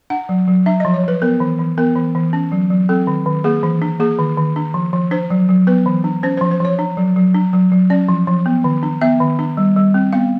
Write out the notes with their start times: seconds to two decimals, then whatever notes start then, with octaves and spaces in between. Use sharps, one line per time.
0.10 D4 F#5
0.29 F#3
0.47 F#3
0.66 D4 E5
0.80 D#5
0.85 F3
0.94 C#5
1.04 F3 B4
1.22 B3 A#4
1.40 E3
1.59 E3
1.78 B3 A#4
1.96 E3
2.15 E3
2.33 C#4
2.52 F#3
2.70 F#3
2.89 C4 A4
3.07 D#3
3.26 D#3
3.44 A#3 G#4
3.63 E3
3.82 D4
4.00 A#3 G#4
4.19 D#3
4.37 D#3
4.56 D4
4.74 F3
4.93 F3
5.11 D4 C5
5.30 F#3
5.49 F#3
5.67 B3 B4
5.86 E3
6.04 D4
6.23 C#4 C5
6.37 C5
6.41 F3
6.51 C5
6.60 F3 C#5
6.79 D4
6.97 F#3
7.16 F#3
7.34 D4
7.53 F#3
7.72 F#3
7.90 C#4 D5
8.09 F3
8.27 F3
8.46 B3
8.64 D#3
8.83 D4
9.01 B3 E5
9.20 D#3
9.39 D4
9.57 G3
9.76 G3
9.94 C4
10.13 B3 F5